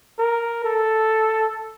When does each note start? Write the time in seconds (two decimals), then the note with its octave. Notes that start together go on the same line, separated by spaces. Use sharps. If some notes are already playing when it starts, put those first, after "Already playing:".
0.19 A#4
0.64 A4